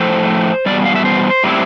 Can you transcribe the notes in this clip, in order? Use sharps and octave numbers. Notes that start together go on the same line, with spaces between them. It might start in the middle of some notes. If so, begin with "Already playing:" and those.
Already playing: A2 F3 A3 C5
E2 B2 G3 D5
F5
E5
C5
A2 G3 C4 E4